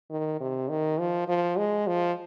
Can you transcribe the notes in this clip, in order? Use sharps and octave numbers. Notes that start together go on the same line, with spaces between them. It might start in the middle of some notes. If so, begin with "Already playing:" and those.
D#3
C3
D#3
F3
F3
G#3
F3